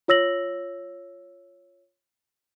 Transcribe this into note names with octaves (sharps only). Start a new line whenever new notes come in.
F4 C#5 E6 A#6 F#7